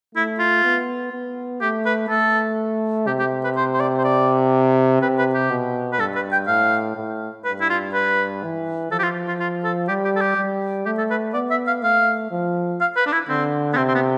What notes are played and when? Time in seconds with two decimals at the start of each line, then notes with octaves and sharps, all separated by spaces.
0.15 A3 E4
0.39 F4
0.64 B3
1.12 B3
1.61 A3 G4
1.86 B4
2.09 A3 A4
3.06 C3 G4
3.19 G4
3.44 B4
3.56 C5
3.74 C5
3.80 D5
3.98 C5
4.04 D5
5.02 C3 B4
5.18 B4
5.34 G4
5.50 B2
5.92 B4
5.99 G2 A4
6.15 B4
6.32 G5
6.47 A2 F5
6.97 A2
7.44 G2 B4
7.61 E4
7.70 F4
7.94 B4
8.43 E3
8.91 F3 A4
8.99 G4
9.03 F4
9.28 F4
9.40 F4
9.64 A4
9.88 G3 G4
10.04 G4
10.16 A4
10.21 G4
10.37 G3
10.85 A3 G4
10.98 A4
11.11 B4
11.34 B3 D5
11.50 E5
11.67 F5
11.83 A3 F5
12.31 F3
12.80 F5
12.96 B4
13.06 D4
13.13 E4
13.29 D3 C4
13.73 B3
13.77 C3 C4
13.88 C4
13.94 B3